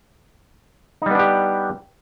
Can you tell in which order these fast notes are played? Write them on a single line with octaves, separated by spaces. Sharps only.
D#4 G3 B3 D4 G4